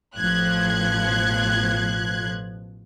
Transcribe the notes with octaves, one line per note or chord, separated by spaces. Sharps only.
A1 B2 F3 F#6 G#6